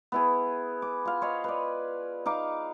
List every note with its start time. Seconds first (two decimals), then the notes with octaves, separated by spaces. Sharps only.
0.12 B3 E4 G#4
0.82 D6
1.05 F4 F5
1.21 C5 C#5 D#5 B5
1.44 B4 D5
2.26 D#4 F5 D6